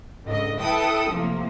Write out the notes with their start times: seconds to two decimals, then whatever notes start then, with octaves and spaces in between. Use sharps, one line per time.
0.24 C#2 G#2 D3 D#5
0.60 E4 A4 B4 G5 D#6
1.10 A2 C3 F3 A#3